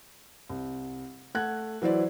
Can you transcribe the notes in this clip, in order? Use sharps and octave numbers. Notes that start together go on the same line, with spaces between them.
C2
A3 F#5 F#6 G#6
E3 F#3 E4 C5 D5